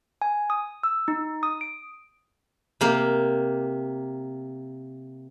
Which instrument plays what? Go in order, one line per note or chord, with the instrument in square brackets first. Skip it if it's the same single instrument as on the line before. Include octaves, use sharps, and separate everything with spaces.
[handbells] G#5
D#6
E6
D#4
D#6
D7
[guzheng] C3 A#3